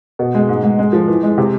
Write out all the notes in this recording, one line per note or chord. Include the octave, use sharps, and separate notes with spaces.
B2
G#3
G#2
G#2
G#3
F3
E3
G#3
C3